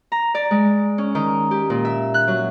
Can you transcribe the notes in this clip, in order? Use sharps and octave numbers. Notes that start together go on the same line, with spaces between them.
A#5
D5
G#3
C#4
D#3
G4
A#2
E5
F#6
F#3